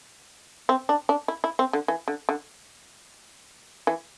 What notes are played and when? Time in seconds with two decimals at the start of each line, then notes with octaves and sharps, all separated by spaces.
0.69 C4
0.89 D4
1.09 D4
1.28 E4
1.44 E4
1.59 C4
1.73 D3
1.88 E3
2.08 D3
2.29 D3
3.87 E3